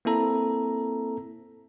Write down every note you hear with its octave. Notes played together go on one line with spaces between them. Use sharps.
A#3 C4 E4 A4 A#5